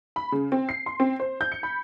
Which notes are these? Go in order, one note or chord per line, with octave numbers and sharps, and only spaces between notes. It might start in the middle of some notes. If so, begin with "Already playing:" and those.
B5
C#3
C4
C7
C6
C4
C5
G6
C#7
B5